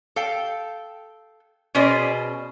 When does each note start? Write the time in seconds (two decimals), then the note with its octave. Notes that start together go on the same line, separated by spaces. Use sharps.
0.16 A4 F5 G5
1.75 B2 C#4 G#4 C5 D5 D#5